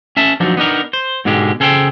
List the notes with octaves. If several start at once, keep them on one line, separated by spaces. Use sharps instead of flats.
C#4 E5 A5
F3 F#3 D4 D#4
B3 D4 D#4 A#4
C5
G#2 B2 D3 G#3 G4
C#3 G#4 A4 C5 F5 G5